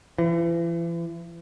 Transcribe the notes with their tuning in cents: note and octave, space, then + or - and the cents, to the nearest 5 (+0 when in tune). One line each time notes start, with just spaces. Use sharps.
E3 +40